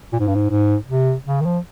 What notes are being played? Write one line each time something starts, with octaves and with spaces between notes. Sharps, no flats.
A#2
G#2
G2
G#2
G#2
C3
C#3
D#3
F3